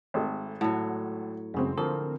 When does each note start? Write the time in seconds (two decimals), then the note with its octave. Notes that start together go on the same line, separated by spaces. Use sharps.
0.14 G#1 G#3 A3
0.61 A2 F#3 F#5
1.54 F#2 C#3 G#3 C4
1.78 D3 F3 A#4